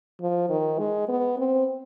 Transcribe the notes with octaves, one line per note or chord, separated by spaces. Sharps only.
F3
D#3
G#3
B3
C4